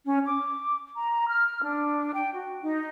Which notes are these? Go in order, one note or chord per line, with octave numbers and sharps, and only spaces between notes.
C#4
D6
A#5
F6
D4
G5
F#4
D#4